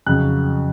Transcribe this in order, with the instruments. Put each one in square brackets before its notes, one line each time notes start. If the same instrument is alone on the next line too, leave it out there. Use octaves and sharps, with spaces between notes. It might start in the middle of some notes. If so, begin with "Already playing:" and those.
[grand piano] F2 C#3 F#3 F#6